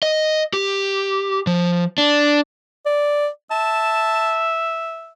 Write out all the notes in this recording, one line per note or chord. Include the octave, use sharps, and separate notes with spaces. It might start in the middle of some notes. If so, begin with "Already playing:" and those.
D#5
G4
F3
D4
D5
E5 A5